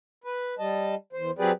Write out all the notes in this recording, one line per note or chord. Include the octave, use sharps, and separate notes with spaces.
B4
G3 D#5 A5
E2 C5
F#3 C4 G4 G#4 B4 D5